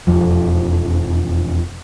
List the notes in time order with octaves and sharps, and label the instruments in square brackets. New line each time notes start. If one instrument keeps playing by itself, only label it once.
[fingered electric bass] E1 F2 F3